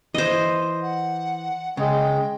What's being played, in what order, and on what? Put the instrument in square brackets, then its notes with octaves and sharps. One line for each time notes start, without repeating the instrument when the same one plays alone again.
[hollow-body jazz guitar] E3 [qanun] C5 D#5
[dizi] F#5
[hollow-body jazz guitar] C#3 [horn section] G#3 [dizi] G5